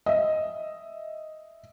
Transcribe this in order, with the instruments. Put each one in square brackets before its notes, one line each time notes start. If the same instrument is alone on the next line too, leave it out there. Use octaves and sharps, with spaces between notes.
[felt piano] D#5 E5